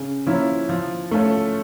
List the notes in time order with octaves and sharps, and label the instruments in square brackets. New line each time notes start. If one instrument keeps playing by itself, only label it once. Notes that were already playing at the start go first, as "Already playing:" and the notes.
Already playing: [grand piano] C#3
F3 A#3 C#4 E4
F3
A3 C#4 F4 A4